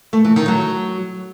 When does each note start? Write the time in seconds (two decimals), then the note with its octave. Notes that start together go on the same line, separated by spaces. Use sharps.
0.13 A3
0.25 E3
0.36 D#3
0.48 F#3